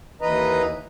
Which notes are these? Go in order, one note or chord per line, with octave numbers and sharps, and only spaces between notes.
D#2 E3 B4 D#5 A#5